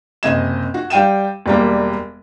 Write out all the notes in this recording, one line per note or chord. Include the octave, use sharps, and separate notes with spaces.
F#1 C3 D#5 G#6 E7
F#4
G3 F5 G5 D#7 E7
E1 G3 A#3